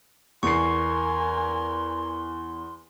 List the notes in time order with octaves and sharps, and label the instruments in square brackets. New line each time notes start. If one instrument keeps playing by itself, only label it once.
[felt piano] E2 C7 [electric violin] A#4 G#5 [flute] C6 [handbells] C#6